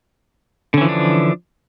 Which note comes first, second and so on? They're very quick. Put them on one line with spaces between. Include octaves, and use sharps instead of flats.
D3 C#4 E3 F3 D4